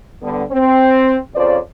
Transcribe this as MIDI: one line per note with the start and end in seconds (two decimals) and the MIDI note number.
0.22 0.43 50
0.22 0.43 55
0.22 0.43 59
0.51 1.19 60
1.35 1.58 41
1.35 1.58 49
1.35 1.58 53
1.35 1.58 72
1.35 1.58 74